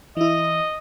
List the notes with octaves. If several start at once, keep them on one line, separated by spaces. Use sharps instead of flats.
E3 E4 D#5